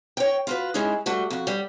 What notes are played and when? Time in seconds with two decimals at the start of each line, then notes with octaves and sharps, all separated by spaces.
0.17 C#5 G5
0.47 F4 F#4 B4
0.74 G#3 C#4 D#4 E4 G#4
1.06 G3 A3 F#4 F#5
1.30 F2 F#4
1.47 G3